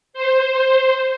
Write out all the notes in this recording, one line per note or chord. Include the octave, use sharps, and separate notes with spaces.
C5